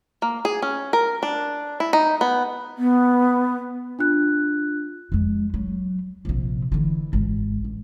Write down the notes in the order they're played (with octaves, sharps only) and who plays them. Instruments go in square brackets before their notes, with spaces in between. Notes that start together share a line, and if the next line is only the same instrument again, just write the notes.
[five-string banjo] A#3
G#4
C#4
A#4
D4
E4
D#4
B3
[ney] B3
[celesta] D4 F4 F#6
[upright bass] F2 G#3
F#3
A#1 C3
D3 E3
G#1
A1